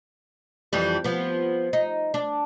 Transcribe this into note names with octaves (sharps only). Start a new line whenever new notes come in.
F2 E3 G3
F3 B3
D#4
D4